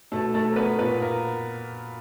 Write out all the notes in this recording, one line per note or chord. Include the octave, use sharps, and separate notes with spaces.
B2 A3 A4
A3 A4
A#4
B3 B4
A#2 B3 B4
A#3 A#4